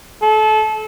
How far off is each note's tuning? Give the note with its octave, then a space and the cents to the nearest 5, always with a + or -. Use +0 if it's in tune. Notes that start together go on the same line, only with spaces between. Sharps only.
A4 -30